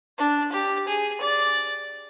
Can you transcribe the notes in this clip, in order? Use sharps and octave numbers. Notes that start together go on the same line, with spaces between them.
D4
G4
G#4
D5